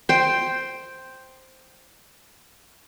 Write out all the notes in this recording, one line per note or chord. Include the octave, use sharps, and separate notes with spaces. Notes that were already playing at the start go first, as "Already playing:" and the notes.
C5 G5